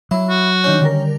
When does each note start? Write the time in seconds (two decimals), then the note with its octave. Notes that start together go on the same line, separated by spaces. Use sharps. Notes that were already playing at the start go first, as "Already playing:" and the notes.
0.11 F#3 E4
0.29 F#4
0.64 D#3 C#4 D4 G6
0.81 D3 G3 A#4